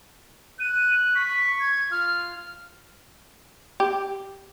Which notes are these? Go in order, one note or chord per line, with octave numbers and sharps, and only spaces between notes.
F#6 D#7
C#6 B6
G#6
F4 F6
G4